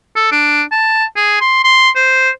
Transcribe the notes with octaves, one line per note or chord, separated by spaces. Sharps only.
A4
D4
A5
G#4
C6
C6
C5